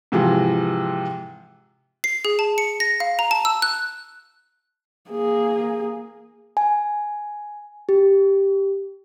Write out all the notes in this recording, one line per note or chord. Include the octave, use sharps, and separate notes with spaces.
G#2 C3 E3 F3
C7
G#4
A5
C#7
A#6
F5
A#5
A5
E6
F#6
A#3 G#4
G#5
G4